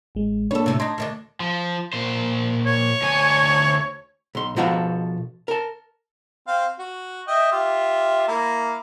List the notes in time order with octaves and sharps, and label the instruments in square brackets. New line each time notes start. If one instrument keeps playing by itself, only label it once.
[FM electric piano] A1 G#3
[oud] G3 A4 [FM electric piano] A#3 D4 C#5
[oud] D2 A2 C3
[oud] D4 D#4 [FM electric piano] C6 G#6 A#6
[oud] D2 D#3 D4
[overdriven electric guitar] F3
A#2 C5
[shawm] C#5
[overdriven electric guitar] D2 G#5
[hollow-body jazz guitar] B1 C6
B2 F3 F#4 A4 F5 A#5
A#4 A5
[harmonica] C4 F5
F#4
D#5 E5 G5
F4 G4 E5
A#3 E4 A#4